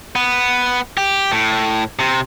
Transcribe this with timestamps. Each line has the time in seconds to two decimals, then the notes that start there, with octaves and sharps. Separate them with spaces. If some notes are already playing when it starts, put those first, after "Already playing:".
0.16 B3
0.97 G4
1.32 A2
1.99 C3